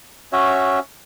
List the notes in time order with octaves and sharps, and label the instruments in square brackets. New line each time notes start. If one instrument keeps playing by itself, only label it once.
[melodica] C#4 F#4 C#5 E5